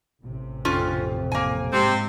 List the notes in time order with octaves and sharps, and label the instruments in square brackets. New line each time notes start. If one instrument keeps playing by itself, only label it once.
[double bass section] A1 C3
[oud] F2 [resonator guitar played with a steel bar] C#4 F4
[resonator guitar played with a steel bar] A#3 G#5
[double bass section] G#2 G#3 [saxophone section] C3 C4